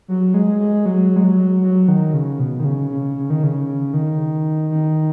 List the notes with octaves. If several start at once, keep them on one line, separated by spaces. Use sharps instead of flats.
F#3
G#3
G#3
F#3
G#3
F#3
F#3
D#3
C#3
B2
D#3
C#3
C#3
C#3
D#3
C#3
D#3
D#3